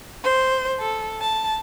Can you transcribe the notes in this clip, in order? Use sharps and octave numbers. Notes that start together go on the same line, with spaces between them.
C5
A4
A5